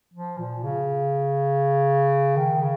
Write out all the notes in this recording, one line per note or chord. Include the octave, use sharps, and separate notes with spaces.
F3
A#2
C#3
D#3
C#3